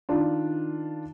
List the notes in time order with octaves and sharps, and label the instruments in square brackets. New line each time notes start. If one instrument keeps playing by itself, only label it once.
[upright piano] D#3 D4 F4